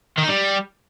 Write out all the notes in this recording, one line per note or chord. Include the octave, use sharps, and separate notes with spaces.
D#3
D#4
G3